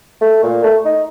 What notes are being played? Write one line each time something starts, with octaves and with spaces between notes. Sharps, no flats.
A3
A#2
A3
D#4